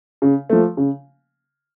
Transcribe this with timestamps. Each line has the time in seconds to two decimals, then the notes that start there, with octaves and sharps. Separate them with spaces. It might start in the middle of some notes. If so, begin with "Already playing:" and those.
0.22 C#3
0.49 F3 A3
0.77 C#3